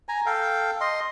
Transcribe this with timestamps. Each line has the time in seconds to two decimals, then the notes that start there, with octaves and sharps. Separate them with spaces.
0.09 G#5 A#5
0.26 A4 F5 G5
0.81 D#5 C6